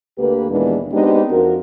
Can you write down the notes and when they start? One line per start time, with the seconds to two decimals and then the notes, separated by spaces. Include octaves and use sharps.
0.18 D2 D3 A#3 G4 B4
0.50 D#2 A#2 E3 G#3 B3 D4
0.92 G#3 B3 C4 D4 D#4 G4
1.30 F2 F3 C4 F#4 A#4